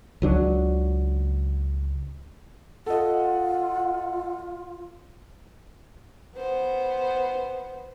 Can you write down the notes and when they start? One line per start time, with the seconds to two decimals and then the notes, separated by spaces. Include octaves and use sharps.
0.22 C#2 F#3 D4
2.86 F4 A4 D#5 F#5
6.37 B3 C5